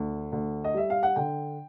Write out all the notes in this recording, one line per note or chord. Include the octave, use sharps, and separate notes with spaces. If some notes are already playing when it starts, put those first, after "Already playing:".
Already playing: D2
D2
D#5
G3 E5
F5
F#5
D3 G5